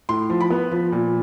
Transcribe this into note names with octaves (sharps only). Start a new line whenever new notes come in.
A2 C6
F3
B5
B3
F3
A#2